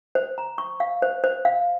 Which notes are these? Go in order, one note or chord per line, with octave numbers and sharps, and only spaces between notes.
C5
A#5
C#6
F5
C5
C5
F5